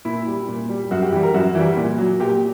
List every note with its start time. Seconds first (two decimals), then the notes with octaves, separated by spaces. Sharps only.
0.05 A#2 E4
0.27 G3
0.49 A#2
0.69 G3
0.91 F#2 F#4
1.02 G4
1.12 E3 G3 G4
1.23 A#4
1.34 F#2 F#4
1.55 E3 G3
1.77 A#2
1.98 F#3
2.20 A#2 G4